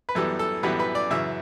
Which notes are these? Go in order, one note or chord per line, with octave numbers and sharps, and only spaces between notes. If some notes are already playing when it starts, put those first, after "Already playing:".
B4
F#2 E3 G3 B3 A4
A4
F#2 E3 G3 B3 B4
B4
D5
F#2 C#3 E3 E5